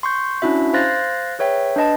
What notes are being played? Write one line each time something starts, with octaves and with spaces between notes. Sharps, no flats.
C6 C#6 G6
C#4 D4 E4 F#4 E5
C5 F5 C6 F#6 A6 A#6
G#4 B4 C#5 E5 G5
D4 B4 D#5 A5